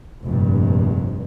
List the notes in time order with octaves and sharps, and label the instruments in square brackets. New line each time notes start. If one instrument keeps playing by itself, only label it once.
[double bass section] F1 A#1 G2